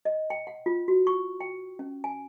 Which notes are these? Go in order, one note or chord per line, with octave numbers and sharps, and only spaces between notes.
D#5
G5
F#5
F4
F#4
C#6
G5
C#4
G#5